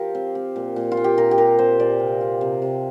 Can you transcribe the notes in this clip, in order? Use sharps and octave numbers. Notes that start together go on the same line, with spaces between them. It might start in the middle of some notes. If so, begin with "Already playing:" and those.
Already playing: F3 F4 G4 A#4 F5
C4
C4
A#2
A#2
F4
A#2
G4
A#2 A#4
G4
A#2 A#4
C4 C5
A#2 D5
C3
F4
C3
C3